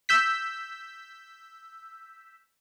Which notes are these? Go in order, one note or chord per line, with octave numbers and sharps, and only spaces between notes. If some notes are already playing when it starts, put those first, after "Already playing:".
E6 G6 B6